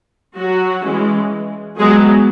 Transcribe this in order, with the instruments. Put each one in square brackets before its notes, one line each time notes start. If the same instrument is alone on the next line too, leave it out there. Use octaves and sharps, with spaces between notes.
[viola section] F#3 F#4
E3 G#3 C#4
F#3 G#3 B3 G#4